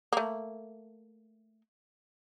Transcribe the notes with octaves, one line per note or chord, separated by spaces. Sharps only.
A3 A#3